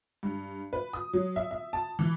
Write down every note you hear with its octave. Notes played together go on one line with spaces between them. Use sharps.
G2
B4
D#6
F#3
E5
E5
A5
E3